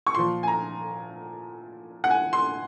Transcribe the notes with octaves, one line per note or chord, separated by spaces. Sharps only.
C#6
A#2 F3 C6
G#5
A#5
F#5
G#5
C6